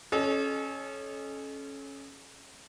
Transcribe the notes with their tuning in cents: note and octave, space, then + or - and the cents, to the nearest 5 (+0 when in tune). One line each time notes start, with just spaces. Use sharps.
C#4 -10 A4 -35 D#5 -30